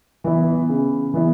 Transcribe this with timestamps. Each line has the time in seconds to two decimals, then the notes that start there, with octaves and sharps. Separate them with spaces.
0.24 E3 B3 E4
0.69 C#3
1.14 E3 B3 E4